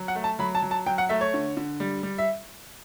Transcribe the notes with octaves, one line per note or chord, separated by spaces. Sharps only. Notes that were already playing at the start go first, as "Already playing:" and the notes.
Already playing: F#3
F#5
A3
A5
F#3 B5
A5
F#3
A5
F#3 G5
F#5
A3 E5
C#5
D3
D3
G3
G3
E5